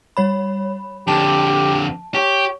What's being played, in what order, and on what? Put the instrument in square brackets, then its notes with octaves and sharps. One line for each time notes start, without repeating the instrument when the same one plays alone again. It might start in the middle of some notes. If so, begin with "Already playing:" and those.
[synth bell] G3 C#5 B5
[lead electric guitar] F2 D3 [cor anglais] G4 [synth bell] A5
[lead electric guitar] G4 [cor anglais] C#5